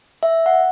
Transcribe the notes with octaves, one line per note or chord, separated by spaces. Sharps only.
E5
F#5